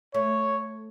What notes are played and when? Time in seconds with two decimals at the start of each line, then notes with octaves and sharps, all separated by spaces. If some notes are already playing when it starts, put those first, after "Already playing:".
0.14 A3 C#5